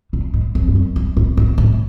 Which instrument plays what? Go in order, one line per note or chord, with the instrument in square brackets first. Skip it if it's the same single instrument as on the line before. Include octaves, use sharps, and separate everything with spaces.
[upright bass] A#2
G#2
F2
G2
F#2
G2
G#2
G#2
A2